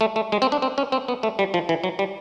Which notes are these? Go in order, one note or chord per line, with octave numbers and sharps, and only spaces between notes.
A3
A3
G#3
C4
D4
C4
C#4
C4
B3
A3
G3
F3
E3
F#3
G3